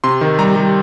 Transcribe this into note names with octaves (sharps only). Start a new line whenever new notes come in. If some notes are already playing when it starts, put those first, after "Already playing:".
C3 C6
D#3
G3 A#5
G3